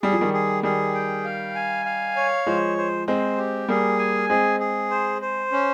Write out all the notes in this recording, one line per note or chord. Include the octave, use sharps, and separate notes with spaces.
G3 G#4
F3
D#3 G3
G#4
D#3 G3 G#4
G5
F5
G#5
F5
C#5
F3 G#3 C5
C5
G#3 C4 C5
G4
G3 A#3 G#4
G#5
G#3 C4 G#4
G#4
C5
C5
C#4